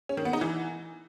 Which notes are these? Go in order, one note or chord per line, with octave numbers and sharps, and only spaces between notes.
C#4
D#3
B3
D#4
E3